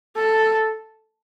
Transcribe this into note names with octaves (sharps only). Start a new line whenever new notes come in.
A4